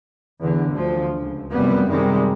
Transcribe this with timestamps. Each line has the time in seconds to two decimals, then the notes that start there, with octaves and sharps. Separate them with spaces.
0.41 E2 D3
0.72 D2 D3 F3
1.21 C#2
1.51 F1 F#2 G3 B3
1.89 F#2 C3 D#3 G3 G#3